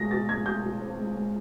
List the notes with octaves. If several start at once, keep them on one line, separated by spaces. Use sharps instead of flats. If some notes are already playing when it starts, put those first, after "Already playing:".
Already playing: B2 G#3 A#6
B2 A6
G#3 G#6
B2 G6
B2
C4
G#3
G#3